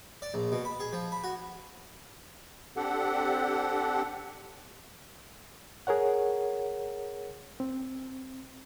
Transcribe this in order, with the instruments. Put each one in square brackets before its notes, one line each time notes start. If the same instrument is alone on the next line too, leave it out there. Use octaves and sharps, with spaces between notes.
[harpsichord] D5
A#1
B2
B5
G#4
F3
B5
F#4
[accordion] C4 D4 G4 A4 F#5
[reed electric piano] G#4 A#4 C#5 F#5
C4